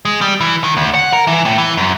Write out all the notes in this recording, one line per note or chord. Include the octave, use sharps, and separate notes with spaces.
G#3
G3
E3
D#3
D2
F#5
A#4
E3
A2
E3
F#2